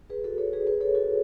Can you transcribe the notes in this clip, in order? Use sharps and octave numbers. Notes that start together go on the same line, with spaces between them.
G#4 B4
F#4 A4
A4 C#5
G#4 B4
G#4 B4
A4 C#5
F#4 A4